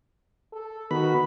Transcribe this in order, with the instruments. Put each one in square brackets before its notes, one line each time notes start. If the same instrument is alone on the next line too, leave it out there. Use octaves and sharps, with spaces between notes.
[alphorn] A4
[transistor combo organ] D#3 B3 B5 [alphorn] F#4